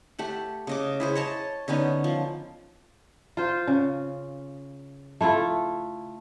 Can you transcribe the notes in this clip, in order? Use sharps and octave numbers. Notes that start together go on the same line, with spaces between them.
A3 G4 F#5
C#3 D#5 D6
E4 G#4 C5
C#5 D#5 A5
D3 B3 C#4 D#4
F3
F4 C5
C#3
A3 E4 F4 A4